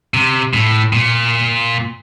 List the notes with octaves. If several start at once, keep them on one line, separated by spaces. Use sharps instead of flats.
C3
A2
A#2